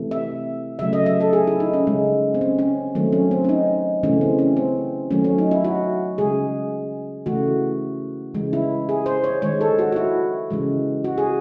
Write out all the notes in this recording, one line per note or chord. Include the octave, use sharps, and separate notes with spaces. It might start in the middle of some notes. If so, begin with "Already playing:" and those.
Already playing: C3 E3 A3
E5
C#3 F#3 A3 E5
D#5
E5
A4
G#4
E4
D#4
C#4
C#3 G#3
C4
C#4
C#4
D#3 F#3 A3 C4
C#4
C4
C#4
D#4
C#3 E3 A3 C#4
C4
C#4
C4
D#3 F#3 A3 C#4
C#4
D#4
E4
F#4
C#3 G#3 G#4
C#3 E3 A3 F#4
C#3 E3 G#3
E4
G#4
C5
C#5
D#3 G#3 C#5
A4
F#4
F#4
E4
C#3 E3 G#3
F#4
G#4